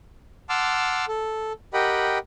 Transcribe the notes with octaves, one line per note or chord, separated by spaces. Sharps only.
F#5 A5 C6 D6 E6 F6
A4
G4 A#4 D#5 F#5 G5 B5